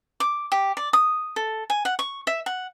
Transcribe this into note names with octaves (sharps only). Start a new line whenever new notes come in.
D6
G4
D5
D#6
A4
G#5
F#5
C#6
E5
F#5